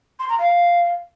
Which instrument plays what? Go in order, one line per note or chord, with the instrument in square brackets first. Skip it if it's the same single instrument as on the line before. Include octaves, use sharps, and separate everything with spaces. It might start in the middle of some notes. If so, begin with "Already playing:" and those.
[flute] C6
A#5
F5